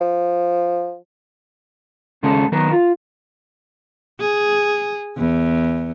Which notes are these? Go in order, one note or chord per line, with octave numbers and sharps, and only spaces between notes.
F3
D#2 C#3 G#3 C#4 A4
D#3 F#3 B3 A#4
F4
G#4
E2